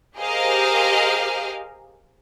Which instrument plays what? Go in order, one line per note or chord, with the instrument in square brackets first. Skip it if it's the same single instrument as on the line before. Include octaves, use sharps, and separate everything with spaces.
[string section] G4 G#4 A#4 C5 D#5 F5